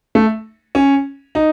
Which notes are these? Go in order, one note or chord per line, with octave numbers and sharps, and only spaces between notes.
A3
C#4
D#4